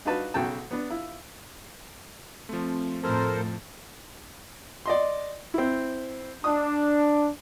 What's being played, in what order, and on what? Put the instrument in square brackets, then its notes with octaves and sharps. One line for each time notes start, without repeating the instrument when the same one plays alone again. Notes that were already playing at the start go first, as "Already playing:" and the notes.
[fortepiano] D4 D#4 F4 F#4 B4 A5
B1 C#3 F#4 G5 A5
B3 D4
E4 F4
[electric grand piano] F3 A3 [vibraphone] C4
[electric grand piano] F2 F3 [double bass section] A2 A3 [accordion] A4 A#4 C5
[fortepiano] D5 D#5 C6
C4 E4
[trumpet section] D4 [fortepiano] D#6